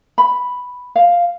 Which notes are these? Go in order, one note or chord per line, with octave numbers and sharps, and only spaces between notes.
B5
F5